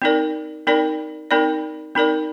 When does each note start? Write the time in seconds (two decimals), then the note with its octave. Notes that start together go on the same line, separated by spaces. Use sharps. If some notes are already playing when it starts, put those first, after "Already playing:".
0.02 C4 D#4 A#4 D5
0.67 C4 D#4 A#4 D5
1.31 C4 D#4 A#4 D5
1.95 C4 D#4 A#4 D5